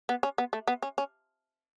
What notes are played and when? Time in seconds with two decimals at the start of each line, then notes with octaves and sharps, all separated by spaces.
0.09 B3
0.23 C#4
0.38 B3
0.53 A3
0.68 B3
0.82 C#4
0.98 C#4